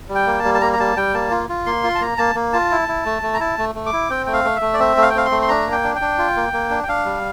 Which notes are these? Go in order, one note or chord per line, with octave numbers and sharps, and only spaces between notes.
G3
G5
A#3
A5
G3
A5
A#3 A#5
A#5
G3 A5
G3 G5
A#3 A5
F4
F4
A#3 C6
F4
A5
A#3 A#5
A#3 A5
A#3
F4 A5
E4
E4
A3
A3
A#5
E4 A5
A3
A3
D6
E4
C4 G5
A3 G5
F5
A3
E5
A3
D5
C4 E5
A3
F5
G5
C4 F5
C6
A3
C6
D4 A#5
A#3
G5
D4
G5
D4
F4
A#3
A#3
D4
G5
D4 F5
G3